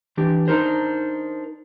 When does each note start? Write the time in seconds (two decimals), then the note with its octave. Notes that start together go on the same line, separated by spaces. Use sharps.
0.17 E3 D4 G4
0.48 D4 D#4 A#4 C5